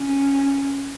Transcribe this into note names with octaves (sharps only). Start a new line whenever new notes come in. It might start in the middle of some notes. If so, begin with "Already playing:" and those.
Already playing: C#4